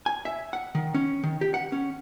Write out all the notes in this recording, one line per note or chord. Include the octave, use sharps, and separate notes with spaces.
G#5
E5
F#5
D#3
C#4
D#3
G4
F#5
C#4